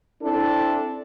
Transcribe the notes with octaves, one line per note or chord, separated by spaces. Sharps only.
C4 D4 E4 A4